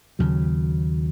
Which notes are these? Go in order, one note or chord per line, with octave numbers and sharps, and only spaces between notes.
D#2 C#3 F#3